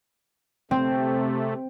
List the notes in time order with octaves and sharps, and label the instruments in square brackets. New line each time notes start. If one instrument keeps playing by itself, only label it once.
[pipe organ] C3 A3 [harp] C4